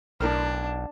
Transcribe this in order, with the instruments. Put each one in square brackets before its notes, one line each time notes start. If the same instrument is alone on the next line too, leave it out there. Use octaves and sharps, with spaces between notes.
[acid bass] B1 [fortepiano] A2 A#4 F6 [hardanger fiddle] D4